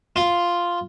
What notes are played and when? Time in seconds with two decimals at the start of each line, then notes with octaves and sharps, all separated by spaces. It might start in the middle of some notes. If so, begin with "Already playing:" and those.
0.16 F4